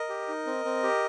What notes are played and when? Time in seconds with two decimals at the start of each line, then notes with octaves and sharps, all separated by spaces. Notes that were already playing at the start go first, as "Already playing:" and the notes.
Already playing: A#4 D#5
0.09 G4
0.28 D#4
0.46 C4
0.65 C4
0.83 G4